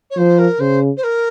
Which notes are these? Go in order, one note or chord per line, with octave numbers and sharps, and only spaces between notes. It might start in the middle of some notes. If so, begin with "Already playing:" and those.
C#5
F3 C5
A#4
C#3 C5
C5
A#4